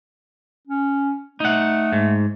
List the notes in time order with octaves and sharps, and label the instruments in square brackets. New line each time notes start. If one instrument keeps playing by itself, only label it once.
[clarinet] C#4
[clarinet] A3 [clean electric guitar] D#4 F#5
[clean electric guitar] G#2